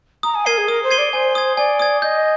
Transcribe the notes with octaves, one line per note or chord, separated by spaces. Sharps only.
A#5 D#6
G#5
A#4 G#6 C7 D#7 G7
G#4
A#4 D#6
C5
G#6 C7 D#7 G7
D5
C5 G#5
D#6 G#6
D5 G#5
D#6 G#6
D#5 G6